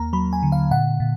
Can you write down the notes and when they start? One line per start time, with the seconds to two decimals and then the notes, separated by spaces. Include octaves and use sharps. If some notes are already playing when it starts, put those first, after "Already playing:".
Already playing: D#2 A#3 A#5
0.13 F#3 B5
0.33 G#5
0.43 D3
0.52 F5
0.71 A#2 F#5
1.00 A#2